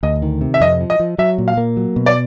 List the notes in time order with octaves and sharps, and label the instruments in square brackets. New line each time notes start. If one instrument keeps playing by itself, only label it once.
[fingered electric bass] D2 [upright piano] D#5
[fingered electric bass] D#3
C3
[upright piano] E5
[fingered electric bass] F2 [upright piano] D#5
[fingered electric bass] F3
[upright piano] D#5
[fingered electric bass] F3
[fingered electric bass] F#3 [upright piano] E5
[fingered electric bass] A#2
[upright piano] F5
[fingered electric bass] A#3
F#3
B2
[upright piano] D5